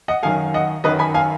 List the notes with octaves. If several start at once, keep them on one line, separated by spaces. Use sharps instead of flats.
D#5 F#5
F#2 D#3 F#3 F5 G#5
D#5 F#5
F#2 D#3 F#3 B4 D#5
G#5 B5
F5 G#5